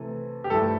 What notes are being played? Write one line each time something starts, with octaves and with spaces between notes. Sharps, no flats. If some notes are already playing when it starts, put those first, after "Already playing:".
Already playing: C3 E3 A3
G4
G2 F3 A3 E4 A4